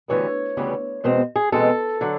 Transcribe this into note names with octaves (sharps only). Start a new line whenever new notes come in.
D2 C#3 E3 G3 B3 C#5
D2 C#3 E3 G3 B3
E2 B2 G#3 C4 C5
G#4
E2 B2 G#3 C4 A4
D3 F#3